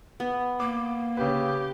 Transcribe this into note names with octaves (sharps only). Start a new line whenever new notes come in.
B3
A#3 D6
C#3 G4 B4